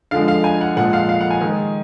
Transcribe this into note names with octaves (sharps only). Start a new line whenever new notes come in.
D3 F3 G#3 F5
F5
G#5
F#5
A#2 F3 G#3 F#5
F5
F5
F#5
G#5
D#3 G#3